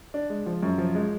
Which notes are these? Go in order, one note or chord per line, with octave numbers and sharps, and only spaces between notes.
D4
G#3
F3
F#2
F3
G#3